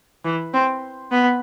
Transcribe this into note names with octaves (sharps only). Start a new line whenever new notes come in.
E3
C4
B3